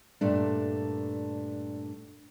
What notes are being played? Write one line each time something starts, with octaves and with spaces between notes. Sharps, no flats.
G2 A#2 A3 D4